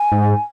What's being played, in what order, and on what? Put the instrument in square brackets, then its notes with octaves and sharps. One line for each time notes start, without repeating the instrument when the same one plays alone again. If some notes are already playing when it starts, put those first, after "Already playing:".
Already playing: [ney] G#5
[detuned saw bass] G#2